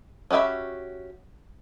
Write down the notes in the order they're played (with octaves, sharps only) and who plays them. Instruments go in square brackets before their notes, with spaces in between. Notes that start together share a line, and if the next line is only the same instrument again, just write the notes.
[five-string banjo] C#4 F#4 G4 E5 B5